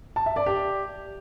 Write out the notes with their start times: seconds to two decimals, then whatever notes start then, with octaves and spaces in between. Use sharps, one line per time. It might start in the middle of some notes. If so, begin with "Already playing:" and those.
0.16 A5
0.26 E5
0.36 D5
0.46 G4